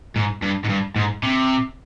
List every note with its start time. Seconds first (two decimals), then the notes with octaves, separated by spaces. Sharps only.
0.16 G#2
0.43 G2
0.65 G#2
0.69 G2
0.96 G#2
1.23 C3